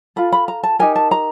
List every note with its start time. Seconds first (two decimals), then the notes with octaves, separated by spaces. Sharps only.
0.16 F4 A4 B5
0.32 B5
0.48 A#5
0.63 A5
0.79 D#4 G4 A#4 G#5
0.96 A5
1.11 A#5